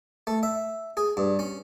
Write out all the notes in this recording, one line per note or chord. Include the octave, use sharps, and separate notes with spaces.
A3
E5
G#4
G2
C#4